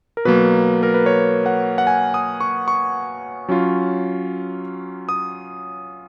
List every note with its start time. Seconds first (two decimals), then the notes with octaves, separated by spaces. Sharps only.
0.17 A#4
0.25 B2 F#3 A#3 B4
0.83 A#4
0.94 B4
1.06 C#5
1.46 F#5
1.78 F#5
1.87 G#5
2.14 D#6
2.40 C#6
2.68 C#6
3.49 F#3 C#4 F4
5.09 D#6